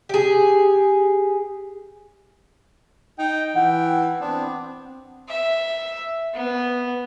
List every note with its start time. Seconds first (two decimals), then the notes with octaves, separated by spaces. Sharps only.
0.09 G4 G#4
3.19 D#4 G5
3.55 E3 F#5
4.21 B3 C4 D4
5.28 E5
6.34 B3